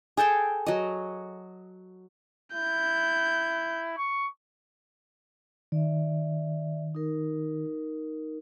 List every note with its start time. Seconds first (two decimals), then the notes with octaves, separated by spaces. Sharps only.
0.17 G#4 A4 G5 A5
0.66 F#3 D#5
2.54 E4 G6
3.97 C#6
5.72 D#3 D5 E5
6.95 D#4 A#4